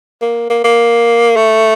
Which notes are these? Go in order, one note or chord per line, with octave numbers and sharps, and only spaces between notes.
A#3
A#3
A#3
A3